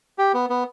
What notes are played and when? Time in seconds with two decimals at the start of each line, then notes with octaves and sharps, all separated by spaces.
0.18 G4
0.34 B3
0.50 B3